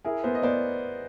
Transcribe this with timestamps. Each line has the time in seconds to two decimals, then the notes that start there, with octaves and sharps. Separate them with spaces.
0.04 E4 G#4 A#4
0.24 B3 A#4 C5
0.35 D#5
0.43 B3 C5 D5